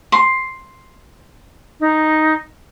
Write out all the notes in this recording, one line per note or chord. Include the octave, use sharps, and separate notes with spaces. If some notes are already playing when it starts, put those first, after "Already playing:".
C6
D#4